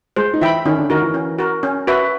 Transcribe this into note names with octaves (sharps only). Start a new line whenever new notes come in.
G#3 G#4 C5
D#4
E3 E4 E5 G5 B5
D#3 C#4 D#4
D3 D4
D#3 D#4 F#4 A#4
E3 E4
C#4
F#4 A#4
C#4
F#4 B4 E5